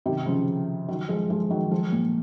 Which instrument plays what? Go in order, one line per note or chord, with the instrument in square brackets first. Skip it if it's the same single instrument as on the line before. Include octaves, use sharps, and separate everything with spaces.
[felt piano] C3 D#3
C#3 F3
D#3 F#3
F3 G#3
F3 G#3
D#3 F#3
F3 G#3
A#2